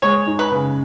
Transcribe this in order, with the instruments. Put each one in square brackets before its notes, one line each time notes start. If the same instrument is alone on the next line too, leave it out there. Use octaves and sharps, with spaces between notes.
[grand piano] G#3 [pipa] C#5
[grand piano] D#4
[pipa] B4
[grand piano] C#3